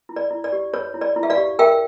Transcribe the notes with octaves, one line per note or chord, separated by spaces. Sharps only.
E4
D5
E4
D5
G4
C#5
E4
D5
E4
E5
D5 F5
G4
A#4 E5 G5